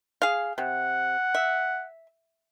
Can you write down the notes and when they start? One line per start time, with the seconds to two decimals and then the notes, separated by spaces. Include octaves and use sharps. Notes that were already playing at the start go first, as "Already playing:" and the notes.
0.22 G#4 F5
0.58 C3 F#5
1.35 E5